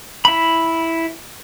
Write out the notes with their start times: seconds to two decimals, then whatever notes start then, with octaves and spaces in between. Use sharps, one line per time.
0.25 E4 B5